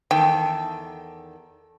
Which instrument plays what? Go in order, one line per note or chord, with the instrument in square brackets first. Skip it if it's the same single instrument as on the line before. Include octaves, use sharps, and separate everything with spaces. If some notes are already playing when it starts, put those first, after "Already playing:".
[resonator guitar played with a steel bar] E2 D#3 A4 [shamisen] G5